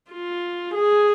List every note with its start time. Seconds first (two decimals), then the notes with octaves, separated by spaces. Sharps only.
0.11 F4
0.75 G#4